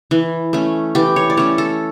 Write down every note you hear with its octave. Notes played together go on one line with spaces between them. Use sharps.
E3
A3 C#4
E3 G4
C#5
D5
A3 C#4 C#5
A4